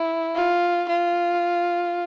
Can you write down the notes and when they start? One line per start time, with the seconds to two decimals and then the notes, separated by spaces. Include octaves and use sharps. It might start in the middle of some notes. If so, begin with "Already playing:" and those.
Already playing: E4
0.36 F4
0.89 F4